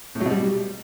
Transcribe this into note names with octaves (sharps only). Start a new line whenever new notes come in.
A2
F#3
B2
G3